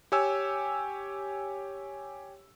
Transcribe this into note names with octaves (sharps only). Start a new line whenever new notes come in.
G4 C#5 G#5 E6